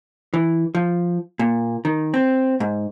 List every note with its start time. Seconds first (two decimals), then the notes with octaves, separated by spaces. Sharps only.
0.34 E3
0.75 F3
1.39 A#2
1.85 D#3
2.14 C4
2.60 G#2